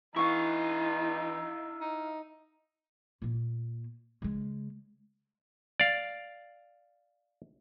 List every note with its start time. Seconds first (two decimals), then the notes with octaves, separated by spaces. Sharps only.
0.16 E3 D#4 E4 F5 C#6
1.81 D#4
3.22 A#2 A#3
4.22 C#3 G#3
5.80 D5 F5